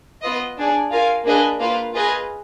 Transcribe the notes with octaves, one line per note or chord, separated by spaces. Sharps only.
B3 F4 B4 D#5
D4 G#4 D5
F4 A#4 F5 G#5
A#3 D4 G#4 B4 D#5
A#3 F4 B4
F4 G#4 B4 D#5